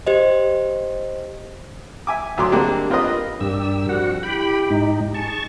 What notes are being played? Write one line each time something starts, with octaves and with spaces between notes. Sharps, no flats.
G4 C5 D#5
E5 G#5 D6
D2 F#3 C6 D6
G3 G#3 A#3 C4 D4 G4
C4 F4 G4 A#4 B4 D#5
G2 D4 G4 A#4 D5 E6
F2 G3 F#4 F#5
E4 G4 G5 B5
G#2 D#4
G#4 A5 C#6